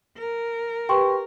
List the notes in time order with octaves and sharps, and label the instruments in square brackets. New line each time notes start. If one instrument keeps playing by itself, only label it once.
[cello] A#4
[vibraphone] G4 B4 [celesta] G5 C6 C#6